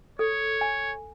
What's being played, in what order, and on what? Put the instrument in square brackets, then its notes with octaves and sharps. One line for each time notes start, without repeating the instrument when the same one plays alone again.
[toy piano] A4 [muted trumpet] C#5
[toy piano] G#5